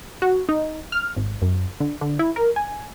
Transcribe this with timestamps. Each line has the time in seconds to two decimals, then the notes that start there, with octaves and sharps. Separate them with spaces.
0.22 F#4
0.49 D#4
0.92 F6
1.16 G#1
1.42 F#2
1.80 D3
2.01 D3
2.19 E4
2.36 A#4
2.56 G#5